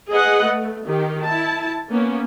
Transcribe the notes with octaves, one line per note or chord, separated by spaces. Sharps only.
G#4 B4 D#5 F#5
A3
D#3 G4
E4 A5
A#3 B3 C#4